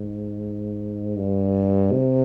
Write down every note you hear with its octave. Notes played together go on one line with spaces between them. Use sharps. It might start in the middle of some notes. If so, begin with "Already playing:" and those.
Already playing: G#2
G2
C3